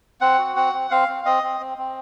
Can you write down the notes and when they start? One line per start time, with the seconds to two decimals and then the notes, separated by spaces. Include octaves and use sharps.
0.21 C4 F#5
0.38 F#4
0.56 C4 F#5
0.73 C4
0.91 C4 F5
1.08 C4
1.25 C4 D#5
1.43 C4
1.60 C4
1.78 C4